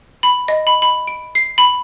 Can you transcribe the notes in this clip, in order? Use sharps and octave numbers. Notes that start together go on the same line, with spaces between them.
B5
D#5
B5
B5
D7
C7
B5